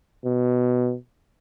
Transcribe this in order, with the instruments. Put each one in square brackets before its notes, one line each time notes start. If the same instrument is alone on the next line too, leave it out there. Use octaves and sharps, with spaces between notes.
[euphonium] B2